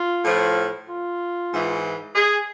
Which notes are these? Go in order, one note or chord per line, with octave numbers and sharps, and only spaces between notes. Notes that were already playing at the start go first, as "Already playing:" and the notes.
Already playing: F4
A2 F3
F4
G#2 E3
G#4